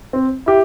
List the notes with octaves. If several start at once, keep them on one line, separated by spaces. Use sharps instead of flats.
C4
E4 G4